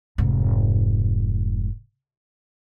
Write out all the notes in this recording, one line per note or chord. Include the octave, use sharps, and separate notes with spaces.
F1 G#2